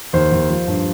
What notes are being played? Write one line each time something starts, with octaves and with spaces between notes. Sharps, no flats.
D#2 C5
D#2
F3
G2